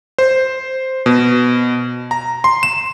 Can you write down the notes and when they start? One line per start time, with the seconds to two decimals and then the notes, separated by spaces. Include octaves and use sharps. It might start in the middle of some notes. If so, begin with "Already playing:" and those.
0.18 C5
1.06 B2
2.11 A#5
2.44 C6
2.63 E7